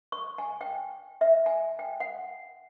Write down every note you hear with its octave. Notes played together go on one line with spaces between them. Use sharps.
C#6
G#5
G5
E5
G#5
G5
F#5